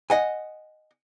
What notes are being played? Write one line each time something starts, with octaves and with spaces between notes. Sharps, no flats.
D#5 F#5 G#5